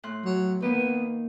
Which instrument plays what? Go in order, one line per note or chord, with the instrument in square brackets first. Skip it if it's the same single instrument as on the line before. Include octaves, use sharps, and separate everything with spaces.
[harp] A2 C6 F#6
[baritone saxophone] F#3
[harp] D#3 A#3 [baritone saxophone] B3